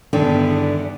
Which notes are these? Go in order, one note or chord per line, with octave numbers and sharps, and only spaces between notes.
E2 G2 D3 D#3 B3